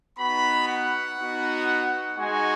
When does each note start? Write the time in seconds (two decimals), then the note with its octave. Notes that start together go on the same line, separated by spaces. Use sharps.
0.18 B3 D#4 F#4 B5
0.67 F#5
1.17 B3 D#4 F#4
2.17 G#3 D#4 F#4 G#5